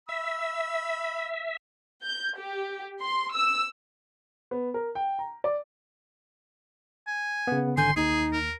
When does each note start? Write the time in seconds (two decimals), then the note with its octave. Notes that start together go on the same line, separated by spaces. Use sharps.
0.09 E5 B5 E6
2.04 G6
2.36 G4
3.00 C6
3.32 E6
4.51 B3
4.74 A#4
4.95 G5
5.19 A#5
5.44 D5
7.07 G#5
7.47 C#3 B3
7.77 G#1 D3 G#5 C6 G6
7.96 D#2 D#4 G#4
8.33 A#4